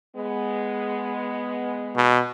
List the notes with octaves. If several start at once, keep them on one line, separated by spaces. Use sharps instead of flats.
G#3 B3
B2